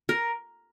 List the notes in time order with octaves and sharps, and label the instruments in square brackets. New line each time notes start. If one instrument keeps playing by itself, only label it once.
[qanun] A#4